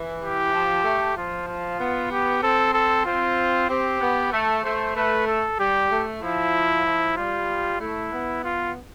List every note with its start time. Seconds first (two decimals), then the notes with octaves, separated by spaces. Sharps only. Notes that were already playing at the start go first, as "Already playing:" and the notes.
Already playing: E3
0.21 G4
0.53 F3
0.84 A3
1.16 F3 F4
1.48 F4
1.79 B3
2.11 G4
2.43 C4 A4
2.74 A4
3.06 C4 F4
3.69 C4 G4
4.01 B3
4.32 A3 A4
4.64 A3 C5
4.96 A3 B4
5.27 A4
5.59 G3 G4
5.91 A3
6.22 F3 E4
6.86 F3
7.17 G3 F4
7.80 A3 E4
8.12 B3
8.44 F4